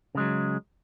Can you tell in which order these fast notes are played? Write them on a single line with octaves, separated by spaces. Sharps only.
C#3 G#3 F#3